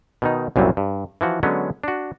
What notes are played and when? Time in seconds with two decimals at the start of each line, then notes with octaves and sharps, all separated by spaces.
0.22 B2 D#3 D#4
0.56 C2 F#2 A#2 F#3 G3
0.77 G2
1.21 E3 F3 F#4
1.43 D3 F#3 G#3 B3 C#4
1.84 D4 F#4